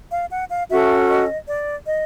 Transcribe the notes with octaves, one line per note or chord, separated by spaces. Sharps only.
F5
F#5
F5
C#4 F#4 A4 E5
D#5
D5
D#5